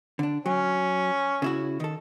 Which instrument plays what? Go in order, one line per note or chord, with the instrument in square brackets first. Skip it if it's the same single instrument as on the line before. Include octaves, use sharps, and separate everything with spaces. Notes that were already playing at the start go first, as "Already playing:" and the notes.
[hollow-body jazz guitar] D3 D4
[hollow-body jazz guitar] F#3 [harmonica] C#4
[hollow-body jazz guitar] C#3 E4 F#4
D#3 A4